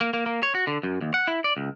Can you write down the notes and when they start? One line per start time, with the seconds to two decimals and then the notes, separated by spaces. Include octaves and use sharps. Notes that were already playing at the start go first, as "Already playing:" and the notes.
0.01 A#3
0.14 A#3
0.26 A#3
0.43 C#5
0.55 F#4
0.67 D3
0.83 F#2
1.01 D#2
1.14 F#5
1.27 E4
1.44 D5
1.57 C#2